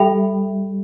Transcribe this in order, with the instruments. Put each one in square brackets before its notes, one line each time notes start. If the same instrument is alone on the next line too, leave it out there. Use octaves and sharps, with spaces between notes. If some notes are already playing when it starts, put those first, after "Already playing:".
Already playing: [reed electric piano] G3 G4 [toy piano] A4 E5 G5 B5